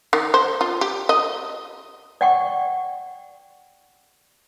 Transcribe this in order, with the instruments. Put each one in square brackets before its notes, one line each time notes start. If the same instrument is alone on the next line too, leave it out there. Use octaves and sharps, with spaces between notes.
[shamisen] D#3
C5
F4
G4
D#5
[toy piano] D5 F#5 G5 C#6